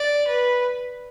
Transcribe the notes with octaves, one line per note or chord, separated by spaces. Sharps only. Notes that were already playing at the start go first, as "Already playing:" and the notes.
Already playing: D5
B4